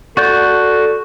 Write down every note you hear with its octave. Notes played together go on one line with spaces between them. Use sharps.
F#4 A4 D5 G6